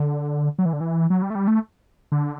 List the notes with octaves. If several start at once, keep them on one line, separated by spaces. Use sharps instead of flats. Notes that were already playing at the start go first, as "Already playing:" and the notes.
Already playing: D3
F#3
E3
D3
E3
F#3
G3
A3
G3
A3
D3